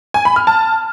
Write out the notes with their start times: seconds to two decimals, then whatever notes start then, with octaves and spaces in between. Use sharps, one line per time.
0.14 G#5
0.25 B5
0.36 F6
0.47 A5